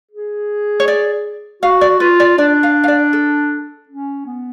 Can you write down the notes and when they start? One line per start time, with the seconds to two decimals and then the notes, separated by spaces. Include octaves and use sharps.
0.11 G#4
0.80 C#5
0.88 D5
1.63 F#4 F5
1.81 D5
2.00 F4 B4
2.20 D5
2.38 D4 D5
2.63 F5
2.84 F5
2.88 D5
3.13 A4
3.89 C#4
4.26 B3